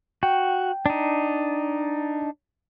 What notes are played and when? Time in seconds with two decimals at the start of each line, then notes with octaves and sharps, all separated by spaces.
0.23 F#4 G5
0.86 D4 D#4